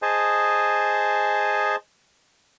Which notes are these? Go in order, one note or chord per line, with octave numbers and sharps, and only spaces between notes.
G#4 C5 D#5 G#5 A5